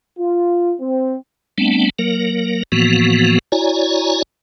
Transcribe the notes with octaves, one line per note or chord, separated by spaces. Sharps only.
F4
C4
G3 A3 B3 C4 D4
F#3 A#3 A#4
A2 E3 F3 A#3 B3 F#4
E4 F#4 C#5 D5 G#5 A#5